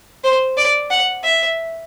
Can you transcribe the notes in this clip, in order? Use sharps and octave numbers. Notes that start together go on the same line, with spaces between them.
C5
D5
F#5
E5